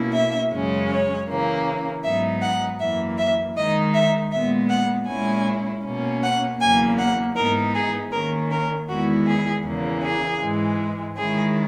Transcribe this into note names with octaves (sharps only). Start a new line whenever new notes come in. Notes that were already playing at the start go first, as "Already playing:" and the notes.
Already playing: B2 A#3 C#4 E4
E5
F#2 C#3 G#3 C#4
C#5
C#3 E3 A#3 C#4
G#2 F#3 B3 D#4 E5
F#5
F#2 E3 A#3 E5
E5
D#3 G#3 D#4 D#5
E5
A#2 G#3 B3 E5
F#5
A#2 G#3 C#4 E4 G#5
B2 A#3 C#4
F#5
E2 C#3 F#3 A#3 G#5
F#5
G#2 E3 B3 D#4 A#4
G#4
D#3 A#3 C#4 A#4
A#4
E2 D#3 G#3 B3 E4 F#4
G#4
E2 C#3 E3 A#3
G#4
G#2 E3 G#3
D#3 G#3 C#4 E4 G#4